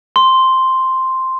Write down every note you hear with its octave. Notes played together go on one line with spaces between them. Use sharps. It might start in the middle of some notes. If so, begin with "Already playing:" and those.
C6